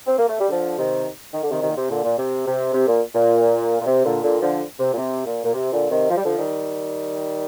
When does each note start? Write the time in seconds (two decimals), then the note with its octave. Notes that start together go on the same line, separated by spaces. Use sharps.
0.07 C4
0.18 A#3
0.28 A3
0.40 G3
0.49 D3 F3
0.78 C3 D#3
1.33 D#3
1.43 D3
1.50 C3 D#3
1.62 C3 D#3
1.69 A#2
1.76 C3
1.90 A#2 D3
2.04 A#2
2.18 C3
2.47 C3
2.73 C3
2.87 A#2
3.15 A#2
3.81 A#2
3.86 C3
4.05 A#2 D3
4.23 A#2 D3
4.41 D3 F3
4.79 C3
4.93 A#2
4.98 C3
5.26 A#2
5.44 A#2
5.53 C3
5.72 A#2 D3
5.91 C3 D#3
6.10 F3
6.17 G3
6.25 D3 F3
6.38 D#3 G3